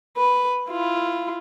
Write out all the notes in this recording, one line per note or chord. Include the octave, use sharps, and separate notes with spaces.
B4
E4 F4